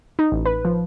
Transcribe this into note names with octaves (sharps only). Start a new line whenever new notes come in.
D#4
A1
B4
F3